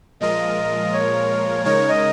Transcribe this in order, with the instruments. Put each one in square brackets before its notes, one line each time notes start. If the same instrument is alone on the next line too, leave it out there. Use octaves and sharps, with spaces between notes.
[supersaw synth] A#2 F3 G#3 F4 A#4 [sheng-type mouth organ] D#5
[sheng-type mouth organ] C#5
[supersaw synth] C#3 G#3 D#4 A#4 [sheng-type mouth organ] C#5
[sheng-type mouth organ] D#5